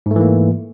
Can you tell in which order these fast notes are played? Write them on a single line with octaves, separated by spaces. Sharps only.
G#2 A3 E3 A#3